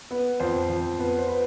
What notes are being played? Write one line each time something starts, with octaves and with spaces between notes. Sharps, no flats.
B3
F2 C5
F2
B3
C5
B4